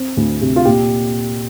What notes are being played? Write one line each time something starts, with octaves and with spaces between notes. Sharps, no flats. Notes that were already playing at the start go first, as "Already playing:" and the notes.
Already playing: C4
D2
C3
F4
A#2 G4